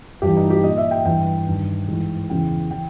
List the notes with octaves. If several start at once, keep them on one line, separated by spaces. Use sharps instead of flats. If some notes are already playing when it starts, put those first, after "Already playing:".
G2 E3 G4
D#4
G4
A#2 D#5
E5
G5
G2 E3 G5
G2 D#3
G#2 E3
E2 C#3 E3 G5
E3 G5